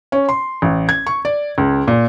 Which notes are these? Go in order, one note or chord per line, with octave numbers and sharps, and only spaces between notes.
C#4
C6
A1
G#6
C#6
D5
C#2
A#2